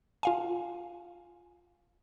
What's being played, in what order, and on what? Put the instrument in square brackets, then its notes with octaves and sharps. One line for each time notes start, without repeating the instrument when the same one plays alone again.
[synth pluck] F4 F5 G#5